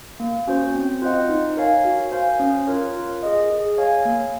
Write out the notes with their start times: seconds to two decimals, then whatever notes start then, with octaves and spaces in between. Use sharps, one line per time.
0.20 A#3
0.47 C#4 F#4 C5
0.75 C4
1.02 F4 C5 D#5 F#5
1.29 D#4
1.57 A#4 C#5 F5 G#5
1.85 F#4
2.12 C5 F5 G#5
2.40 C#4
2.67 F4 A#4 C#5
2.94 F4
3.23 G#4 D#5
3.50 G#4
3.78 C#5 F5 G#5
4.05 A#3